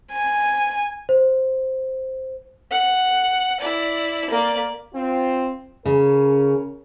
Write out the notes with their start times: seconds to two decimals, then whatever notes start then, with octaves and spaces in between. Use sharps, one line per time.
0.11 G#5
1.09 C5
2.71 F#5
3.60 E4 D5
4.30 A#3 D5
4.94 C4 F4
5.85 C#3 C#4 A#4